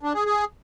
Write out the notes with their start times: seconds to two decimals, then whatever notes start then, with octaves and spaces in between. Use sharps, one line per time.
0.03 D4
0.14 G#4
0.26 G#4